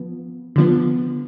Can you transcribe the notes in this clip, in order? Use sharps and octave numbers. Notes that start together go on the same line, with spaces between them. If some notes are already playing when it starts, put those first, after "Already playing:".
Already playing: F3 B3
D3 F3 B3